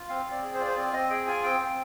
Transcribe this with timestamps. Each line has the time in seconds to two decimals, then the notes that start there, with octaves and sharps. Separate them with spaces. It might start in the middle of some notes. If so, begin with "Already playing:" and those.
Already playing: F4
0.09 C4 F5
0.25 C4
0.31 D5
0.42 G#4
0.54 C5
0.59 F4 D5
0.68 C5
0.76 C4 D5
0.93 C4 D#5
1.10 G#4 G5
1.27 F4 G#5
1.43 C4 G5
1.60 C4